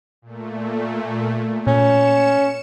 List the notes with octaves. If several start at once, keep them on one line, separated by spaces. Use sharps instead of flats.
A#2 A3
A#2 C#4 C#7 E7